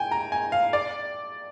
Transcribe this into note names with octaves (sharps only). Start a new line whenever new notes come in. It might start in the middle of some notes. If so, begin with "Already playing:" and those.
Already playing: G5 G#5
A#5
G#5
F5
D5